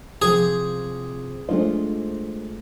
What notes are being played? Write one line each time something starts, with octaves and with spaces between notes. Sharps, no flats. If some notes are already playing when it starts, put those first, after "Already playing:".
C3 F3 G#4 C5
G#3 A3 D4 F4 C5